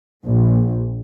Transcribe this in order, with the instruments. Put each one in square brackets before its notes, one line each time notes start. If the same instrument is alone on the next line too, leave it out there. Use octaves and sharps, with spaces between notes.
[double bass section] A#1